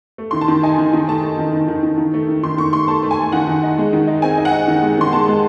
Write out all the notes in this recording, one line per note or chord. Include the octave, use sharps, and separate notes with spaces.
A3
D#3 C6
A5
D#3
D#4 G#5
D#3
D#3
A3 A5
A3
D#3
D#3
D#3
D#3
D#3
A3
D#3
D#3 C6
D#3 C#6
A3 C6
A3 A5
A3
G#5
A3
D#3 F#5
D#3
D#4
G#3
D#3
D#4
C4 G#5
D#4
F#5
D#4
D#3
G#3
D#3 C6
G#3 A5
G#3